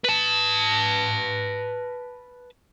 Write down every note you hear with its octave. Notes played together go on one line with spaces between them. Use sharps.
B4 A5